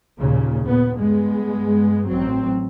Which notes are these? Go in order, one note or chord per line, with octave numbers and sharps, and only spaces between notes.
D#2 A#2 C#3
A#2 B3
G2 G#3 B3
A1 F#3 C4